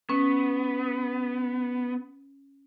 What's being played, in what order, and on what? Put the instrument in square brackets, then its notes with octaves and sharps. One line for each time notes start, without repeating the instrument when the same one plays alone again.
[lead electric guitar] B3 [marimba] C#4